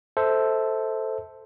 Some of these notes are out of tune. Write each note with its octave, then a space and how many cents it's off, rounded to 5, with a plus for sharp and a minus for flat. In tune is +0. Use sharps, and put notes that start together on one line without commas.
A4 +0 C5 +0 E5 -30